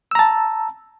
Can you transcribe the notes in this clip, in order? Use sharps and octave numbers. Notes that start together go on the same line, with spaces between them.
A5 A#5 E6